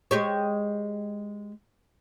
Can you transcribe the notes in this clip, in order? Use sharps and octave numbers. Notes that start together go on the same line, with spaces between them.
G#3 G4 C#5